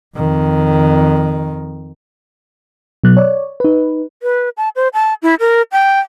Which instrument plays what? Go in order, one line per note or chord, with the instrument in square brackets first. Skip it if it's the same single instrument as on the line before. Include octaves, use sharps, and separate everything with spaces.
[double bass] F2 D#3
[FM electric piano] B2 F#3 F#6
C#5 D5
D#4 B4
[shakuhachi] B4
A5
C5
A5
E4
A#4
G5